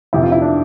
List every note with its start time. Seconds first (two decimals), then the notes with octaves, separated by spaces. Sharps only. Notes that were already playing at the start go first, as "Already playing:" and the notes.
0.13 F2 C3 E3 E4
0.23 F4
0.32 E4
0.41 D4